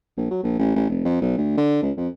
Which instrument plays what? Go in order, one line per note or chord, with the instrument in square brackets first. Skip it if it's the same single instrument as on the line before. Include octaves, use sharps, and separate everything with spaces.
[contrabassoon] A#1
F#3
A#1
A1
A1
F1
F2
B1
D2
D3
C#2
F2